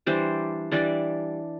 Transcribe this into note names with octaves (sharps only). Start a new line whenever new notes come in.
E3 G3 D4 C5
E3 G3 D4 D5